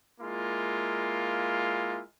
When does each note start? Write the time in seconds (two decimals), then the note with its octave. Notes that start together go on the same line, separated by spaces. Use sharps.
0.21 G#3 A#3 E4 F4